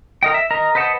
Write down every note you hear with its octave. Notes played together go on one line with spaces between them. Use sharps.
A#4 D#5 G5
E5
A#4 D#5 A#5
B4 C5 D#5 F#5 A5